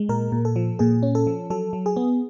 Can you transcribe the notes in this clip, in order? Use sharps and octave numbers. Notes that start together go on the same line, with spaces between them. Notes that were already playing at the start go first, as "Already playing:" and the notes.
Already playing: G#3
A#2 A#4
A#2
A4
F3
A#2 G#4
C#4
A4
F3
F#3 A4
F#3
G#4
B3